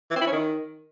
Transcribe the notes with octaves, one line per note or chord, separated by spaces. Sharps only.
E3
C4
E4
C#4
D#3